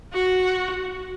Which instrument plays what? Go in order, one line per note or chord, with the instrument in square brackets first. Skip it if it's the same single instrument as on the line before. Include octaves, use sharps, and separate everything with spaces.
[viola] F#4